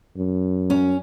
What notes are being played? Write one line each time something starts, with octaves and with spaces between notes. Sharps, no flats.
F#2
C#4